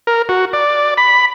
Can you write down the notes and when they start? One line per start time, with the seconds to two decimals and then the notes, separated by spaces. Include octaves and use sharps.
0.07 A#4
0.29 F#4
0.53 D5
0.98 B5